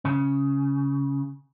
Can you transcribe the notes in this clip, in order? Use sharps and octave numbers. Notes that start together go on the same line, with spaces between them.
C#3